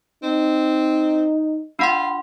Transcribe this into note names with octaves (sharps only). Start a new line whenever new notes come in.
C4 D#4
D4 F4 F#5 B5 C6